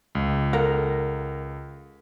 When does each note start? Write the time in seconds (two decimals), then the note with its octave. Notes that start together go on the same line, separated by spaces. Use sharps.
0.15 C#2
0.53 A4 A#4 F#5